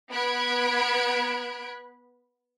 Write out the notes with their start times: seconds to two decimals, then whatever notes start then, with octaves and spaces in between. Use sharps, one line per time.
0.11 B3 B5 F#6 G#6 D7